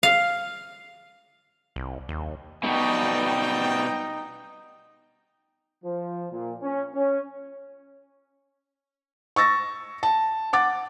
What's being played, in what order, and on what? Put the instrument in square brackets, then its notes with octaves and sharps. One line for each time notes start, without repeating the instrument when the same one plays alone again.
[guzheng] F5
[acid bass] C2
D#2
[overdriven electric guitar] B2 G3 [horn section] F#3 B3 G5 [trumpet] D#4
[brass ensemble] F3
A#2
C#4
C#4
[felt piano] C#6 E6 A6 A#6
A5
F#5 D6 A6